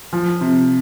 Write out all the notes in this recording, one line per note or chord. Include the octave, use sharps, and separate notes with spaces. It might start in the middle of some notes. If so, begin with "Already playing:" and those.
F3
C3